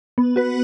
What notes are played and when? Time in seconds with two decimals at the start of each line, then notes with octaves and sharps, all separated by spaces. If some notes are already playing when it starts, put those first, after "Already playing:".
0.18 B3
0.36 F#4 B4